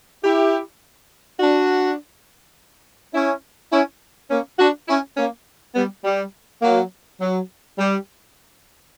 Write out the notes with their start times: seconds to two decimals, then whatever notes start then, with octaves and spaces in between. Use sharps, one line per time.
0.24 E4 G4
1.40 D4 F#4
3.14 C#4 E4
3.72 C#4 E4
4.30 A#3 C#4
4.59 D4 F#4
4.88 C#4 E4
5.17 A#3 C#4
5.75 G3 B3
6.04 G3
6.62 F#3 A#3
7.21 F#3
7.78 G3